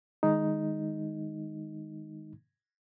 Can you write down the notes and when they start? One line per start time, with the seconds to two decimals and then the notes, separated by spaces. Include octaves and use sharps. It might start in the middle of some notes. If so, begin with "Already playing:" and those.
0.23 D#3 G#3 D#4